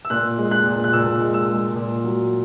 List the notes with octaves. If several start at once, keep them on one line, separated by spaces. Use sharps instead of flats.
E6
A#2 F#6
G#3
F#6
A#2
F#6
A#2 E6
G#3
E6
G#3
A#2
F#3